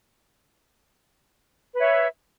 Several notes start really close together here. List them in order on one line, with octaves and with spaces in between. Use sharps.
B4 C#5 E5